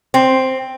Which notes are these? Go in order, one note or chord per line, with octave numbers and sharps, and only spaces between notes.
C4